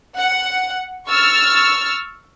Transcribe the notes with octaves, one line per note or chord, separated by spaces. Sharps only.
F#5
C#6 E6 F6 A6